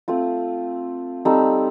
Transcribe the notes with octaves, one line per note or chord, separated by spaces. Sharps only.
A3 C4 F4
G3 C4 D#4 A4